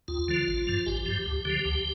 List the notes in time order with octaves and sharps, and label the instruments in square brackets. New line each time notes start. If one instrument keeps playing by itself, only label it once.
[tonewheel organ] D#2 F4
D3 F3
G#1
G2 F3
G#1 G4
G2 F3
D2
D3 F3
D2